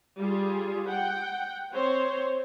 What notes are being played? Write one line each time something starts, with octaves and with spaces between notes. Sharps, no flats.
G3 F4 G#4
F#5 G5
C4 C5 C#5